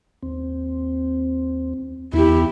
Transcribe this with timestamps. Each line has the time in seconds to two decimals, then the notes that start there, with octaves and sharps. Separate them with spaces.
0.23 D#2 C4
2.13 E2 E4 G4